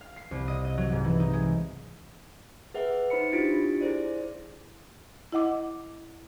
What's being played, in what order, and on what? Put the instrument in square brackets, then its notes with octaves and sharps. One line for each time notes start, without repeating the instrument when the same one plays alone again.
[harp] F5
C7
C2
D#5
D#5
F#3
G#2
E3
D#4
G#3
[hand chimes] G#4 B4 E5 F#5
D#4 C5 B5 C#7
D4 E4 F4 G4 A6 D7
E4 G#4 C5 D5
[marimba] E4 D#5 F#5 D6